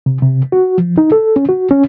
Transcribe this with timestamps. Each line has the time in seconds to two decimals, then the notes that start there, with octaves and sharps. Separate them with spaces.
0.06 C3
0.22 C3
0.52 F#4
0.78 F3
0.98 D#4
1.12 A4
1.36 C#4
1.49 F#4
1.71 C#4